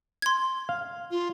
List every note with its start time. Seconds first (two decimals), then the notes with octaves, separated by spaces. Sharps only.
0.22 C6 G#6
0.69 F5
1.11 F4